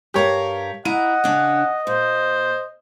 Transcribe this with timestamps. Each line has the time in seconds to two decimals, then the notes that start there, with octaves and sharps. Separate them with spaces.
0.14 G2 G4 A#4 C#5 F5
0.85 E4 D#5 F#5 A#5 D#7
1.24 C#3 D4 C#5
1.87 A#2 C5